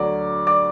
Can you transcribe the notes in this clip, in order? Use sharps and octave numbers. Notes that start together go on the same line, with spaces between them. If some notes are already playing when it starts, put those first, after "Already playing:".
Already playing: D2 D3 F#3 D5 D6
D5 D6